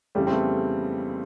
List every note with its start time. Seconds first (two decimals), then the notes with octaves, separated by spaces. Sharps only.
0.15 F2 C#3 E3 G3 A3
0.27 C4
0.32 A3 B3